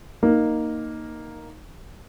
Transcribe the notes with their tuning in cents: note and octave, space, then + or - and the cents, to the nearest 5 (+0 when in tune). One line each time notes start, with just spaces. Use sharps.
A#3 +0 D#4 +0